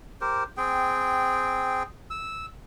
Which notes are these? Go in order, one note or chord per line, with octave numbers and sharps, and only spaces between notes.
G4 A#4 C5
C4 G#4 G5
E6